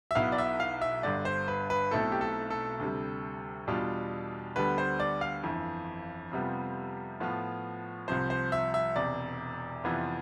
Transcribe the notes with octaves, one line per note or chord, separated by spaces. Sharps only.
E5
B1 B2 B3 E4 F5
D5
E5
F5
E5
G1 G2 D3 D5
C5
B4
B4
B1 B2 A3 C4 E4 A4
G4
A4
A4
D2 C3 G3
E2 B2 G3 D4 F4
D2 D3 G3 B3 B4
C5
D5
F5
G1 F2 E3
F2 C3 G3 B3 F4
A2 F3 B3 F4
C2 C3 F3 C5
C5
E5
E5
E1 E2 C3 D5
F2 C3 E3 B3 F4